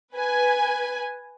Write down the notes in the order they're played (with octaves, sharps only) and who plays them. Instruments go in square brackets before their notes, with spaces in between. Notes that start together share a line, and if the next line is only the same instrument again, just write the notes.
[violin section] B4 G#5